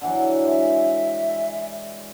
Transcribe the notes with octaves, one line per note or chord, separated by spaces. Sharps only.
D3 E3 F#3 F#5
G#3 E5